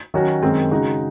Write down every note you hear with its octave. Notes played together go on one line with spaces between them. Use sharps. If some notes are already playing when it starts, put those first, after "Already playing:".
D#3 F#3 C#4 F#4
F#2 D#3 G#3 C4
C#3 G#3 D#4 F#4